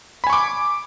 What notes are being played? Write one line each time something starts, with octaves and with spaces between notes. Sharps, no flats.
G#5 B5 C#6 D6